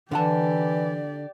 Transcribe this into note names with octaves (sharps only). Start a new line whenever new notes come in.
D3 E3 G4 D5 F#5 A5